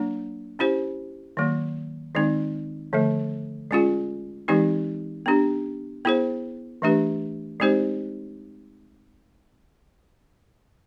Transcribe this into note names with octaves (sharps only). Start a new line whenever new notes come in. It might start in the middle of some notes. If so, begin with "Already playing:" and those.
Already playing: F#3 A#3 D4
C#4 E4 G4 C5
D#3 F#3 A#3
D#3 G#3 C4 D#4
D3 F3 A3
G#3 C#4 F4 G#4
E3 G#3 C4 D#4 G4
B3 D4 G4
B3 E4 G#4 C5
E3 A3 D4 G4 B4
G#3 C4 D#4 G4 C5